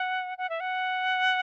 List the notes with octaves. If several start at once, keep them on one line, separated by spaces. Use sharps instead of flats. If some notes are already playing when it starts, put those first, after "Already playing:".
Already playing: F#5
F#5
E5
F#5